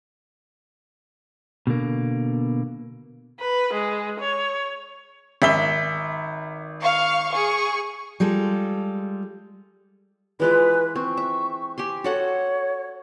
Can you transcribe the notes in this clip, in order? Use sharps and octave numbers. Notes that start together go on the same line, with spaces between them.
B2 D3 A#3
B4
G#3
C#5
G#1 E5 G7
F5 C#6
G#4 C#6
G3 G#3 F4 A4
E3 G#3 F4 B4
C4 C#6
E5
G4 G#5 C6
F#4 A4 C#5 F#5